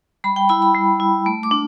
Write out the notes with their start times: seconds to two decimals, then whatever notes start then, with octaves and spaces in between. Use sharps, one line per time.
0.24 G3 B5
0.36 G5
0.49 E4 B5
0.62 B5
0.75 G3
1.00 E4
1.26 A3
1.43 D6
1.51 D4